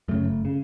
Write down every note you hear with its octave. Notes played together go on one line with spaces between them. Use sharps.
F#2 C#3 A3
F#1
C#3